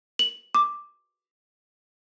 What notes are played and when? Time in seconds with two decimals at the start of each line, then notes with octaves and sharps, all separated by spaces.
0.19 F#7
0.55 D6